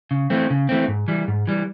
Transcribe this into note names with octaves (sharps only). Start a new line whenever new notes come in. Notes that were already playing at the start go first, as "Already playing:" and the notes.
C#3
E3 A3 C4
C#3
E3 A3 C4
G#2
E3 G3
G#2
E3 G3